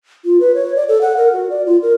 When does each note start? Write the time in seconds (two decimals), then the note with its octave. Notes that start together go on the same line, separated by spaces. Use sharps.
0.25 F4
0.40 B4
0.55 C#5
0.76 D5
0.88 A4
1.01 F#5
1.17 A#4
1.33 F#4
1.50 D5
1.66 F4
1.82 A#4